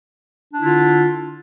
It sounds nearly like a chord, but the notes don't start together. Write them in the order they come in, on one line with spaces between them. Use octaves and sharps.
D4 E4 D3 F4